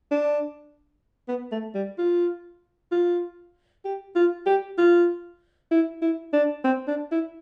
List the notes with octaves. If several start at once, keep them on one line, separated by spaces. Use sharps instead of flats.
D4
B3
A3
G3
F4
F4
G4
F4
G4
F4
E4
E4
D4
C4
D4
E4